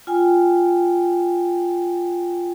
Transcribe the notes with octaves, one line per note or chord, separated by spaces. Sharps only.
F4 G5 G#5